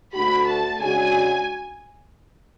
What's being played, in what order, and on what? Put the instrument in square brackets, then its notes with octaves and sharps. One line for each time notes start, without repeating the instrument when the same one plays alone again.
[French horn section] D2 D3 A3 D4 F#4 [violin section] B5
[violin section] A5
[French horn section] C#3 G#3 D4 F#4 [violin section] G#5